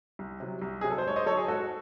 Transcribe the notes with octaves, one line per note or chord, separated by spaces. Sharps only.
C2
C3 F#3
C2
C3 F#3 G#4
A4
C5
G#2 C#5
C5 D#5
F#3 A4 C#5
G#4
G#2 F#4 A4